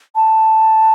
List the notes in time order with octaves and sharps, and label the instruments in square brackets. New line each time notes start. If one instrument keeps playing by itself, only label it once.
[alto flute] A5